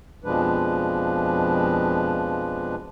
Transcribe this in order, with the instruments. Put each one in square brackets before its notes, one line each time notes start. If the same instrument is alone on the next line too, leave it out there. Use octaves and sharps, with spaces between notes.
[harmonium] F2 B2 F3 G#3 D4 B4